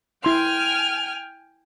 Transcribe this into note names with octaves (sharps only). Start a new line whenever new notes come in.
E4 G5 G#5 C6 F6